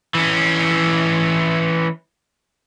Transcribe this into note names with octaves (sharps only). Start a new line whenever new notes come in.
E3 C#4